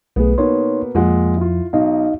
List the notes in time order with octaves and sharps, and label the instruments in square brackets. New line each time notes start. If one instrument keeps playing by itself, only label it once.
[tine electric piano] B1 A3 G#4 [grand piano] B3
[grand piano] B2 A#3 B3 [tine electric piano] D#4 C#5 C6
[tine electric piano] F2 F3 [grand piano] A#2 G#3 F#5
[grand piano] E4 F4
[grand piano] B1 [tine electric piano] D#4 D#5 F5